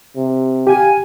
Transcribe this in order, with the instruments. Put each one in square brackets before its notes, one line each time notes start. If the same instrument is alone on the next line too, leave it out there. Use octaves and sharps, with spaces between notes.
[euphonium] C3
[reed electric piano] G4 [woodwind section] F5 G#5